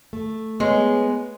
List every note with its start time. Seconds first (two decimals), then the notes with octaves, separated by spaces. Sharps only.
0.13 A3
0.60 G#3 B3 C#5